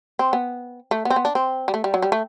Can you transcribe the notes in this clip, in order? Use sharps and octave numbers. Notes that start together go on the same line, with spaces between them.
C4
B3
A3
B3
C4
B3
D4
C4
G3
A3
G3
F#3
G3
A3